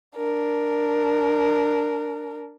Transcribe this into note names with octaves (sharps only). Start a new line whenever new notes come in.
D4 A#4